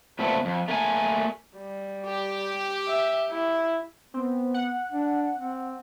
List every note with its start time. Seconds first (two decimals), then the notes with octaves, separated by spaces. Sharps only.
0.19 A#2 A3 B3 C4
0.45 F2
0.68 A3 A#3 F5 G#5
1.57 G3
2.06 G4
2.88 E5
3.32 E4
4.14 B3 C4
4.54 F#5
4.92 D4
5.35 C4